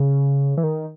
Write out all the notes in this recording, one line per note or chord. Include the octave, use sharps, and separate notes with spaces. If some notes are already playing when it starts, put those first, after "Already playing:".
Already playing: C#3
E3
D#3